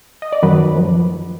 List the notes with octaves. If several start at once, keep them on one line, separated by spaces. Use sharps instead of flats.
D#5
D5
F#2 D#3 F#3 B4
F#2 F3